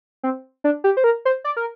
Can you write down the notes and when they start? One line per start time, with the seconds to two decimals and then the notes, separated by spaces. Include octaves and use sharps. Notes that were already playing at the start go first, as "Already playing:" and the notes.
0.23 C4
0.64 D4
0.84 G4
0.97 C5
1.04 A#4
1.25 C5
1.44 D5
1.57 A#4